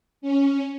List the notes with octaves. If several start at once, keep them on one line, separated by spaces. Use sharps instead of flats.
C#4